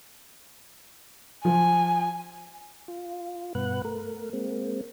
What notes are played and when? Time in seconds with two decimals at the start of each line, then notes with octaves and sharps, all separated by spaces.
1.45 F3 G#5
2.88 F4
3.55 G2 B2 B4 F#5 F#6
3.85 A3 A#4
4.33 G#3 A#3 C4